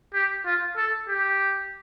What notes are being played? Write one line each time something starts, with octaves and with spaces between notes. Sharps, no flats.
G4
F4
A4
G4